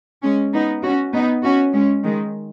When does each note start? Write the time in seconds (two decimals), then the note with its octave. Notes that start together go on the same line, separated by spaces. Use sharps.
0.22 G#3 C#4
0.53 B3 D#4
0.83 C#4 F#4
1.13 B3 D#4
1.43 C#4 F#4
1.73 G#3 C#4
2.04 D#3 G#3